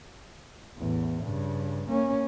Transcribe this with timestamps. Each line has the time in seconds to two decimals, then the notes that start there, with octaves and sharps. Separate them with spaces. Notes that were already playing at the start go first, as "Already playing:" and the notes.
0.77 A1 E2
1.24 G2 C#3
1.89 A#3 C#4